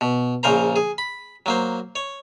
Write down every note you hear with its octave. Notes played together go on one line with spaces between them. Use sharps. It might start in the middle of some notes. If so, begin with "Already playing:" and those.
B2
A#1 C#3 A#4 C5 A#5
G#4
B5
F#3 A#3 C5
C#5